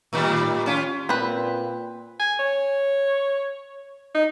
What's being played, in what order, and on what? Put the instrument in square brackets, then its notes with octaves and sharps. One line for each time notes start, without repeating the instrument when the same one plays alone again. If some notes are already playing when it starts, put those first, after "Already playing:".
[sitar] A2 D#3 G3
C#4 F4
[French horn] A#2 [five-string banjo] C4 B4
[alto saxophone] G#5
C#5
D#4